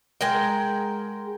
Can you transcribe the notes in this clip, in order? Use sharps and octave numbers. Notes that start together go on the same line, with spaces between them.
G#3 A#4 F#5 G5